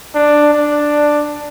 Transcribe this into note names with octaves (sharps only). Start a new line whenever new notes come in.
D4
D4